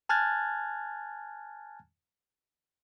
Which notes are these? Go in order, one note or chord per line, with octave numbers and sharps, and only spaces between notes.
G#5 A5 F6 F#6 G#6 A6